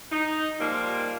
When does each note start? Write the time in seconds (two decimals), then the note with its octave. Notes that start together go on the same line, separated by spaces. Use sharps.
0.12 D#4
0.60 D#3 F3 G3 G#3 A#3